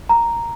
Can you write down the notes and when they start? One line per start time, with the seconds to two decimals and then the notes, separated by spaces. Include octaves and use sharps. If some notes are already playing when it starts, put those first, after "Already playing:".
0.09 A#5